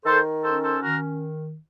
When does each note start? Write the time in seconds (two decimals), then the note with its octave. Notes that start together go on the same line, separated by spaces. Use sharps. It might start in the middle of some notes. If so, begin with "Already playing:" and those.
0.05 D#3 A4 C5
0.44 C#4 A4 C5
0.64 A4 C5
0.82 D#3 F#4 A#4